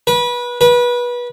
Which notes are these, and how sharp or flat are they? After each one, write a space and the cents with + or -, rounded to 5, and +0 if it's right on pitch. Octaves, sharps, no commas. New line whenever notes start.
B4 -25
B4 -25